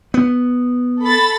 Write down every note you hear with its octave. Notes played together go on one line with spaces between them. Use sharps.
B3
A4 B5 A6